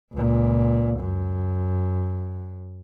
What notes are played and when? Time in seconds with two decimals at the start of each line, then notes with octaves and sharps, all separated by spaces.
0.13 C#2 A#2
1.00 F#2